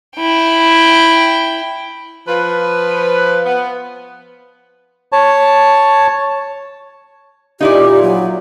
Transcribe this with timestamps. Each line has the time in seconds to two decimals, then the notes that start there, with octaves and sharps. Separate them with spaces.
0.17 E4 G5
2.28 F3 B4
3.46 B3
5.12 C#5 A5
7.60 A#2 D#4 E4 G4 D5
8.03 F#3